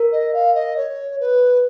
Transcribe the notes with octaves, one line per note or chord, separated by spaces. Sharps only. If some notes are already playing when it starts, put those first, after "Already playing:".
Already playing: A#4
D#5
F5
D#5
C#5
B4